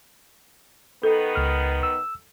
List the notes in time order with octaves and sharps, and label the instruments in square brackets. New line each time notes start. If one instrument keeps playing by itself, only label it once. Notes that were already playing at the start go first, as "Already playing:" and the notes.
[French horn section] D#3 B3 [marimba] A4
[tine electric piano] C#2 F6
E6